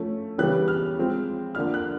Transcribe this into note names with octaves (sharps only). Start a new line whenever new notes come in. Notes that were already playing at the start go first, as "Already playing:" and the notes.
Already playing: F3 A3 C#4
C#3 E3 G3 B3 F#6
F6
F3 G#3 C4
D3 F3 A#3 D4 F6
F#6